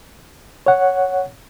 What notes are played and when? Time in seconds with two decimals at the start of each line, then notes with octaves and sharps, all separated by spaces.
0.66 C#5 F#5